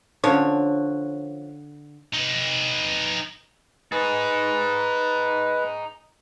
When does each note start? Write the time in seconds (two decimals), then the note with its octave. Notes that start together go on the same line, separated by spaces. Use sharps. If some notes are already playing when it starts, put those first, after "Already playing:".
0.24 D3 F3 C#4 C#5
2.13 D#4 B4
3.92 D#4 G#4 B4